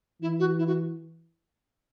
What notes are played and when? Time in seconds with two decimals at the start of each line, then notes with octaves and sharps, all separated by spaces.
0.22 E3 E4
0.40 F#4
0.59 E4
0.67 F#4